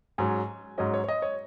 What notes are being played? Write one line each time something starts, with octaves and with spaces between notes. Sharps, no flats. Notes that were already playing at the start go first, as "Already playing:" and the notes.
G#2 F#3 C#4 G#5
G#2 F#3 C#4 D#5
C#5
C#5
D#5
C#5